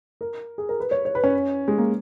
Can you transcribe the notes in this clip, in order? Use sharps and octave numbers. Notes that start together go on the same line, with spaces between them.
A#4
G#4
A#4
B4
C#5
C#5
B4
C#4
G#3
A#3